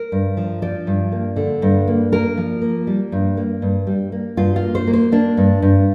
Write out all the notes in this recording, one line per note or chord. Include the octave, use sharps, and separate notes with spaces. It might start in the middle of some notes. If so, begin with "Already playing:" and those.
Already playing: A#4
G2
F3
F3 D5
G2
A#3
D3
G2
A#3
A#3 A#4
F3
A#3
G3
G2
A#3
G2
G3
A#3
G2 F4
F4
A#3
C5
A#3
C5
A#3 D4
G2
G2